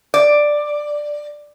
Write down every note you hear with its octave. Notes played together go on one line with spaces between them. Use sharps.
D5